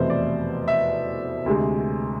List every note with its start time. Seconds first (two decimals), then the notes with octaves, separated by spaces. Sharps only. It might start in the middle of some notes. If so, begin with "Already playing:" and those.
Already playing: F1 E2 B2 A3 E4 C5
0.10 D5
0.68 E5
1.46 D2 C3 G#3